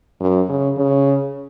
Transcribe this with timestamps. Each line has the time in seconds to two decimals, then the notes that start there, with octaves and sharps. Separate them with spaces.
0.21 F#2
0.49 C#3
0.78 C#3